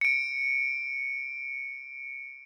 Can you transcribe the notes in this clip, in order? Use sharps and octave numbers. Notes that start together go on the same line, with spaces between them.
C#7 D7